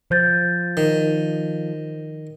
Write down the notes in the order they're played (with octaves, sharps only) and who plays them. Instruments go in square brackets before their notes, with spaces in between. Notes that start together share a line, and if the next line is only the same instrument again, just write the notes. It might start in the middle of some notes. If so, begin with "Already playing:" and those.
[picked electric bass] F3 [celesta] C5 G6 A6
[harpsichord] D#3